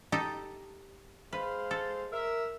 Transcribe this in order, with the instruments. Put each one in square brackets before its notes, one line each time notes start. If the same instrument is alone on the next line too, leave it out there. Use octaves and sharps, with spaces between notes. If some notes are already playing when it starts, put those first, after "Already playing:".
[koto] D#4 G4 A4
[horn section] G#3 C5 F5 [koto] B4
[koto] A4
[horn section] A#4 E5